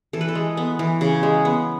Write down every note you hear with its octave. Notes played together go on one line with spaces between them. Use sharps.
E3 A4
B4
A4
G#3
B3
E3
C#3
G#3
B3